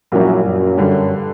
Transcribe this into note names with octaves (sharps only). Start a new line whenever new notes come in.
A#1 F#2 A#2 G3 A#3 E4
F#2
G2 D3 G3